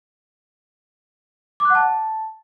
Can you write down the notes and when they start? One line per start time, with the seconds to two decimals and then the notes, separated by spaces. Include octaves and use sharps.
1.60 D6
1.65 F#6
1.70 F#5
1.75 A5